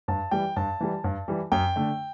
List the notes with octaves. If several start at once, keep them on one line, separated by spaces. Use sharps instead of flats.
G2 A5
E3 G3 G5
G2 A5
E3 G3
G2
E3 G3
F#2 G5
D3 A3